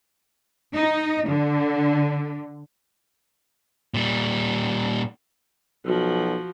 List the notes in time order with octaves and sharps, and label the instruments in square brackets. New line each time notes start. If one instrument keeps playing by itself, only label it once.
[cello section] D#4
D3
[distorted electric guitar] A#2 G3
[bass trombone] B1 [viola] F3 F#4